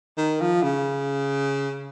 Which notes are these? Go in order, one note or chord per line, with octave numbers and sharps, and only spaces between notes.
D#3
F3
C#3